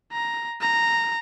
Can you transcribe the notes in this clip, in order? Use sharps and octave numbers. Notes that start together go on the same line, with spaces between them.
A#5
A#5